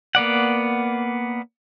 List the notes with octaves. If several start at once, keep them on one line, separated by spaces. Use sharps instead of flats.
A#3 B3 D5 F#5